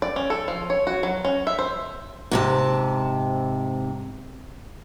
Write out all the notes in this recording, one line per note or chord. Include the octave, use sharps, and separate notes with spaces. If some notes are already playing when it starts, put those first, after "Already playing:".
D5
C#4
A4
F3
C#5
F#4
F#3
C#4
E5
C5
G#2 C3 A5